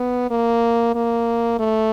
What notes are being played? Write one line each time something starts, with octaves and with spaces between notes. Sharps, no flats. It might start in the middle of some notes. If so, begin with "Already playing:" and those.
Already playing: B3
A#3
A#3
A3